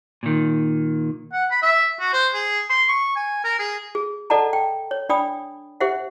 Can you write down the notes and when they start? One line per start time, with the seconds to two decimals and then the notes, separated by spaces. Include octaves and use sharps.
0.23 A#2 D#3
1.32 F#5
1.51 B5
1.62 E5
2.00 F#4
2.13 C5
2.34 G#4
2.70 C6
2.88 C#6
3.16 G#5
3.44 A#4
3.59 G#4
3.95 G#4
4.30 A4 D5 D#5 F#5 A5 A#5
4.53 G5
4.91 C#5
5.09 D4 D5 G5 B5 D#6
5.80 G4 C5 E5 F#5